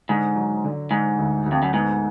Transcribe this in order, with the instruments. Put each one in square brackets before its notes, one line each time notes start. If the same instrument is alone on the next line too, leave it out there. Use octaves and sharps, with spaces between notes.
[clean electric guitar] G#2 [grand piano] D3
[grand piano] F#3
D3
[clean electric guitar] G#2 [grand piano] D3
[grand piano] D2
D2
[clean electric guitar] F2
F#2
[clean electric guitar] G#2 [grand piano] B3